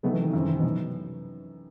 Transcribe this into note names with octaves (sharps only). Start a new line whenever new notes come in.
C3 F#3 A3 B3 D#4 A4
E3
D#3
F#2 D#3 E3 G3 C4
C3
B2
C3 F#3 B3 D#4